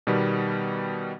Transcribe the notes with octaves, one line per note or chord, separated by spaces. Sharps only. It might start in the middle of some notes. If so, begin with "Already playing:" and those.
B2 D#3 G3 B3